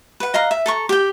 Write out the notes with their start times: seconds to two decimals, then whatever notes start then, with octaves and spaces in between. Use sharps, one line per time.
0.20 B4 F#5
0.34 D#5 F5 F#5 A#5
0.51 E5
0.66 A4 A#5 C#6
0.89 G4 G5